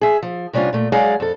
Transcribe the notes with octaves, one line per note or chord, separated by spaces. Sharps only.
G#4 E5
F3
C3 G3 C#4 D4 F4
A#2 A3
F#3 G#3 G#4 D5 F5 F#5
F2 A4